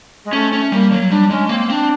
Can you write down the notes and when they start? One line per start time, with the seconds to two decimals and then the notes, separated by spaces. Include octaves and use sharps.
0.24 G#3
0.33 A3 C#4
0.53 C#4
0.72 G3 A#3
0.92 F#3
1.10 G3 D4
1.30 G#3 C#4
1.49 A#3 C4
1.70 C4 D4